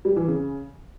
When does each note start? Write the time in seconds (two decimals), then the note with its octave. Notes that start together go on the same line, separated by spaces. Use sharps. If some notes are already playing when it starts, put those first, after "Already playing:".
0.05 G3
0.16 E3
0.28 C#3